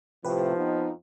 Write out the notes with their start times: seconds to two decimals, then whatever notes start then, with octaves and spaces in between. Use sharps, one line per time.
0.25 A2 C3 F3 G4 B4
0.56 F2 B3 D#4